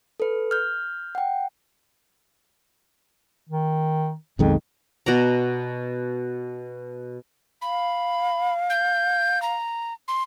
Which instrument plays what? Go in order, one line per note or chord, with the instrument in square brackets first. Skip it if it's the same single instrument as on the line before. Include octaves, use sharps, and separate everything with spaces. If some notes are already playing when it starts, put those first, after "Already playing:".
[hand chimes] A4 B4
F6 G6
F#5 G5
[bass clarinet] D#3
[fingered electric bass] B1 D#3 G#3 [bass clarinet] F2
[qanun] B2 D5 A#5
[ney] F5 [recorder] B5
[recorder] G6
A#5
C6